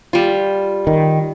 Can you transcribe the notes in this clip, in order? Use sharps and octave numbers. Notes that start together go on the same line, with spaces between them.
G3 F4
D#3